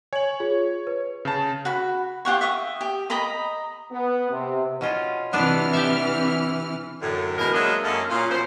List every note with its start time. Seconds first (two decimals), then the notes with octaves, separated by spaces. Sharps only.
0.13 C#5 G#5 F#7
0.40 F4 G#4
0.87 B4
1.25 C#3 A5
1.65 F#4 B5
2.25 F4 G4 F#5 C#6
2.41 E5 C#6 D#6
2.81 G4
3.10 D#5 A#5 B5 D#6
3.91 B3
4.31 C3
4.81 B2 C#4 F4
5.33 C3 E3 B3 D4 B4 F6
5.73 G4 D5 E5
7.01 F#2 A2 D3
7.38 E2 B2 G#3 A#4
7.53 F#3 G#3 A#3 D4 D#5 E5
7.84 F#2 A#3 C#4 A4 D#5 F5
8.10 A#2 C#4 F4
8.30 B2 F3 C#4 C5